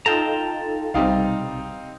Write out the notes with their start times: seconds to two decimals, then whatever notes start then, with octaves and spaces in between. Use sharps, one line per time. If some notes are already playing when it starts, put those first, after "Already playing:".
0.06 D#4 F4 A4 G5 A5 A#5
0.94 B1 C3 G3 C4 D#4 F5